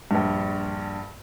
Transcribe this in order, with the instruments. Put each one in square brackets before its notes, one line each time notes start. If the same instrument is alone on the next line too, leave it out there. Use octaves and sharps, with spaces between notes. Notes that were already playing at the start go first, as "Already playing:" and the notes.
[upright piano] A#1 G2